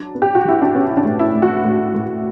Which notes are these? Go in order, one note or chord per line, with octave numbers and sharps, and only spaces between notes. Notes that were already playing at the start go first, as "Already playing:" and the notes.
Already playing: F#3 D4
B3
G4
F#4
F#3 E4
D4
B3 C#4
E4
D4
A2
E4
A2
F#4
A2
A2